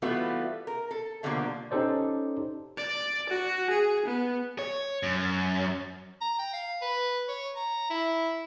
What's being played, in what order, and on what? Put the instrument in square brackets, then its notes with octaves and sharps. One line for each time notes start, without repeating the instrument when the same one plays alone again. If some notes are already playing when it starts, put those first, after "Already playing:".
[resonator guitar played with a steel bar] E3 G3 A3 B3 F4 F#4
A#4
A4
B2 D3 F3 G3 A3 A#3
[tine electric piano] C#4 D#4 G4 A4 C5 D5
[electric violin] D5
F#4
G#4
B3
[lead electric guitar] C#5
F#2
[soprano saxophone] A#5
G5
F5
B4
C#5
A#5
E4